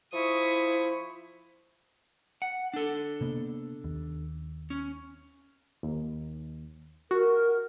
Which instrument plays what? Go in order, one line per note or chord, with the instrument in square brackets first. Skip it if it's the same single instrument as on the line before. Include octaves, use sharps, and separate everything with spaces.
[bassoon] F3 [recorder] E4 [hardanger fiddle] C#6 D#6
[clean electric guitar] F#5
D4 A4
[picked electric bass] C3 A#3 B3
D#2
[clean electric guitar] C#4
[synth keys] D#2
[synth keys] F#4 [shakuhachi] A#4